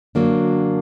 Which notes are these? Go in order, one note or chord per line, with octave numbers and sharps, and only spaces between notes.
F#2 D3 F#3 A#3 D4